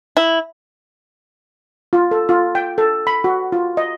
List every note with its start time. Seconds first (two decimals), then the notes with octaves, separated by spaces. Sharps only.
0.17 E4
1.93 F4
2.11 A4
2.29 F4
2.55 G5
2.78 A4
3.07 B5
3.24 F#4
3.52 F4
3.77 D#5